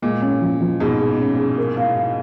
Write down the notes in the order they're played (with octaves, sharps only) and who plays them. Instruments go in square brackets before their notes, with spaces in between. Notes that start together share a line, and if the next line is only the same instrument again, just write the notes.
[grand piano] A#2 [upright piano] G#3
[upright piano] C#4
F3
F3
[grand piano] G#2 B2 [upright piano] G#4
[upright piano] G#4
C#4
G#4
A#4
F5
F5